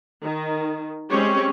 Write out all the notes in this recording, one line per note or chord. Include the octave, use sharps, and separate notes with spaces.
D#3
G3 G#3 C4 C#4 G4 C#5